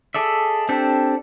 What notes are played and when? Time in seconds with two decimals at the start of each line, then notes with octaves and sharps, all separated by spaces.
0.14 G#4 A4 D5 E5
0.69 C4 D4 G4 A4